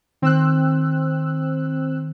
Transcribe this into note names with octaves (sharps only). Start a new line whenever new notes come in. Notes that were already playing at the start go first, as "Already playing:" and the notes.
D#3 C4 E6 F#6